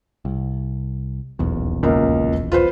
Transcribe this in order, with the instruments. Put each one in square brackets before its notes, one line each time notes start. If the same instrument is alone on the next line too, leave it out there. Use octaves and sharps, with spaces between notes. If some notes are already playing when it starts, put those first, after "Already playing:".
[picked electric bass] C2
D#1 B1 E2
[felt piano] C#2 A#3
F4 B4 C5